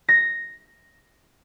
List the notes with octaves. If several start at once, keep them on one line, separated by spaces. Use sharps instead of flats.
A#6